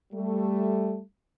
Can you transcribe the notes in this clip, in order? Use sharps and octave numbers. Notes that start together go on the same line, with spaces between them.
G3 A3